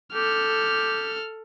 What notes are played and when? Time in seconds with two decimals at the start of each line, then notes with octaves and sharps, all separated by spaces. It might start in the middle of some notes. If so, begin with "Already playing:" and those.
0.14 G4 A4 F6